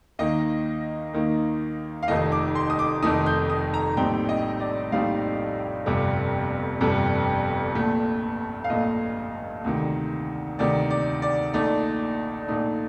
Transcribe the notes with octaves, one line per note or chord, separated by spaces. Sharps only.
D#2 D#3 A#3 D#4 D#5
D#2 D#3 A#3 D#4
F5
F1 F2 D#3 A3 D#4 D#5
D6
C6
D#6
D6
F1 F2 D#3 A3 D#4 D#6
G6
D#6
A#5
A#1 A2 G3 C4 D#4 G5
D#5
D5
A#1 A2 G3 C4 D#4 F5
G1 F2 C3 G3
G1 F2 C3 G3
A#1 A#2 A3
F5
A#1 A#2 A3 D#5
D2 C3 D#3
D2 C3 D#3 D5
D5
D5
A#1 A#2 A3 D#4 D5
A#1 A#2 A3 D#4